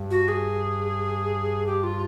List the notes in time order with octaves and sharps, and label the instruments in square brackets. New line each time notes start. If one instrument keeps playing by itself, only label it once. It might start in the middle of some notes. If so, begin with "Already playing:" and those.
Already playing: [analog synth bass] G2
[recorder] F#4
G#4
G4
F4